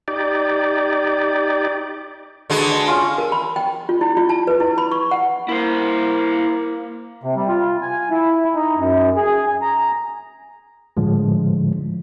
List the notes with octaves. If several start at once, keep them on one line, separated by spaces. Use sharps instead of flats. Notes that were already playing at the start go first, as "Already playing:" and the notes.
D#4 G4 D5
D3 G#3 F#4 B4 C5
D#5 A5
C#4 F4
A#4
B5
G5
F4
E4
F4
A5
B4
E4
B5
C#6
F#5
A#3 E4 C5
C3
G3
F4
G#5
E4
D#4
F#2
G#4
A#5
A2 D3 F3 G#3